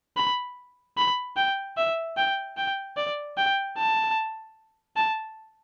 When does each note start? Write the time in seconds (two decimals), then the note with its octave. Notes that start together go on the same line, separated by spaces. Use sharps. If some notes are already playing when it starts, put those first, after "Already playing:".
0.17 B5
0.98 B5
1.36 G5
1.77 E5
2.17 G5
2.57 G5
2.97 D5
3.37 G5
3.77 A5
4.96 A5